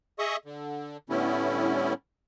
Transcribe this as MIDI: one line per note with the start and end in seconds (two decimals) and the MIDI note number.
0.19 0.36 68
0.19 0.36 75
0.19 0.36 76
0.19 0.36 85
0.19 0.36 87
0.45 0.97 50
1.10 1.93 45
1.10 1.93 50
1.10 1.93 55
1.10 1.93 59
1.10 1.93 61
1.10 1.93 64